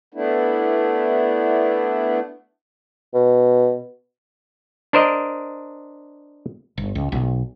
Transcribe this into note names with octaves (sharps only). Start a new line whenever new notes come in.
A3 B3 D4 E4
B2
D4 A#4 C5 D5 D#5
G1
C#2
B1